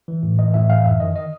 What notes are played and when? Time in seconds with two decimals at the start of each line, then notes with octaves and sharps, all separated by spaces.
0.08 E3
0.23 A2
0.38 E3 D#5
0.54 A2 E5
0.69 E3 F5
0.84 F#2 E5
1.00 D#3 D#5
1.16 D#5